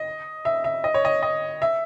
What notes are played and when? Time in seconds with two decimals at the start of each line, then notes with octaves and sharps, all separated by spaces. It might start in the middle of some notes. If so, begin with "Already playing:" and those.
Already playing: D#5
0.45 E5
0.64 E5
0.84 D#5
0.94 C#5
1.05 D#5
1.23 D#5
1.62 E5